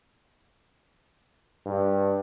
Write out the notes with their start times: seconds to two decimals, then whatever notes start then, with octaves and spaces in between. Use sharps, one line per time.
1.66 G2